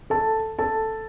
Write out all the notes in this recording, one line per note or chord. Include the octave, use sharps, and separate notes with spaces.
A4 A5
A4 A5